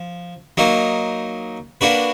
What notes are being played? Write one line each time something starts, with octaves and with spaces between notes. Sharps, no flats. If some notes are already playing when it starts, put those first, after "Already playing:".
Already playing: F3
F#3 A#3 D#4
A#3 D4 F#4 B4